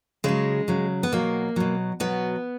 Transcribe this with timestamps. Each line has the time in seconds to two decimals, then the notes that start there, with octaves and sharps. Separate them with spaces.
0.24 C#3 F#3 G#3
0.68 C#3 F#3
1.03 B3
1.12 B2 F#3 A#3
1.56 B2 F#3
2.00 B2 F#3 B3